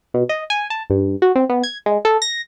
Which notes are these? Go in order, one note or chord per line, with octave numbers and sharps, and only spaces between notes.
B2
D#5
G#5
A5
G2
F#4
C4
B3
G#6
G#3
A4
A#6